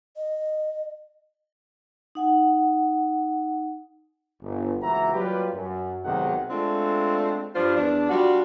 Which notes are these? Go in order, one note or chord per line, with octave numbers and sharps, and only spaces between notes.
D#5
D#4 F#5 G#5
G1
C#2 E3 A#3 F#4 E5 A#5
F#3 G3 A#3 F4 G4 B4
F#2
B1 G#2 C3 D#3 G#4 F#5
G#3 A3 C4 D4 F4
G2 F3 D4 F4 C5
E2 D4
G3 D4 F4 F#4